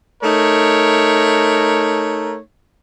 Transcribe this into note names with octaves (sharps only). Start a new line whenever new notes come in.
A3 D#4 A#4 C#5